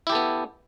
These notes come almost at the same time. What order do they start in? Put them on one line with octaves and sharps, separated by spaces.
E4 G4 A4 B3